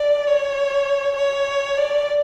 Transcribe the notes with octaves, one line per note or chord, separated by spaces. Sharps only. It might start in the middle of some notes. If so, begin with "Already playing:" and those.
Already playing: D5
C#5
C#5
D5